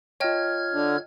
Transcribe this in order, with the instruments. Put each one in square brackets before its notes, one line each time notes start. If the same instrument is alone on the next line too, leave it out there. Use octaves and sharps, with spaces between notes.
[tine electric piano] F4 C#5 [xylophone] D#5 G5 A5 [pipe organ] F6 G#6
[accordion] D3